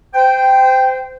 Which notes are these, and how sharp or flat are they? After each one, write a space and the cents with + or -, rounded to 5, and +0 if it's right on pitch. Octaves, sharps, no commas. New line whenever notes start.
C5 -25 G5 +0